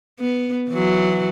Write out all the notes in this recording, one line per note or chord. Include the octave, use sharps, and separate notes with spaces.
B3
E3 F#3